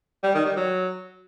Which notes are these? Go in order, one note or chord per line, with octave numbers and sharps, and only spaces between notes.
G3
D#3
G3
F#3